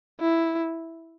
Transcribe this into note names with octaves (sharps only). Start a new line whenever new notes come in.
E4